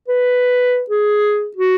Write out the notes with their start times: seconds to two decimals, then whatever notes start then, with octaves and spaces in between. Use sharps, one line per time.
0.08 B4
0.90 G#4
1.56 F#4